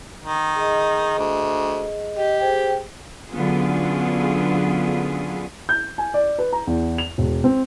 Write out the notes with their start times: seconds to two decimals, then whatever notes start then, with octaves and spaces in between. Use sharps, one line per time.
0.24 D#3
0.56 G#4 D#5
1.18 D2
2.17 G4 D#5
2.40 G#4 C5 G5
3.30 D3 F#3 B3 C#4 F4 G#4
5.69 G6
5.98 G#5
6.14 D5
6.39 B4
6.53 A#5
6.67 E2
6.98 F7
7.18 E1
7.44 C4